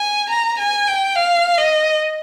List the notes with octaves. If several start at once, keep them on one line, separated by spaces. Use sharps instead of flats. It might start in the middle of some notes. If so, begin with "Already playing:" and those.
Already playing: G#5
A#5
G#5
G5
F5
D#5